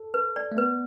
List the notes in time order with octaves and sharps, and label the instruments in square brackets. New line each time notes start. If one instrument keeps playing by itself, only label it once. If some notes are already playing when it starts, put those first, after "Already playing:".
Already playing: [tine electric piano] A4
[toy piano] B4
D5
[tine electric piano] A3
[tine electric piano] B3 [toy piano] B4